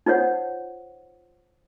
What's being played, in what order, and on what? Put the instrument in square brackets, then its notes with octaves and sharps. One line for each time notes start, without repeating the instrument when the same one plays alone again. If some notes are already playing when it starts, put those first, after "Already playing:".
[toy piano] D#4 F4 C5 C#5 F#5